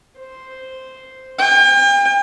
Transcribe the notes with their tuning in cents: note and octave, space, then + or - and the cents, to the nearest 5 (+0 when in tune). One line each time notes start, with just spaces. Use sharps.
C5 -5
G5 +40